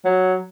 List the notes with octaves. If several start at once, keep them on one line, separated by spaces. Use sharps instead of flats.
F#3